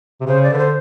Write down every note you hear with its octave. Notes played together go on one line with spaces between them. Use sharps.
C3
C#3 C5
D5
D3 B4
C5